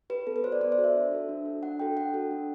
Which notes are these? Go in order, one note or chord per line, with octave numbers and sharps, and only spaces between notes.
G4 B4
B3 A4
B4
F#4 A4 C5 D5
B3 D5
C5
F#4 A4
E5
D4
F#4 A4
D4
F#4 A4
D4 F#5
F#4 A4 G5
D4 F#5
F#4 A4
D4